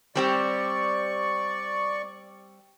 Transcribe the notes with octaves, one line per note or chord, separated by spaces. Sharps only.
G3 C4 G4 D5 C#6